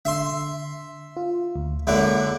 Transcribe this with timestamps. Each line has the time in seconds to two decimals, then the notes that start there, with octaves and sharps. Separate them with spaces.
0.05 D3 E5 C6
1.17 F4
1.56 D2
1.87 F#2 D3 G#3 A#3 E4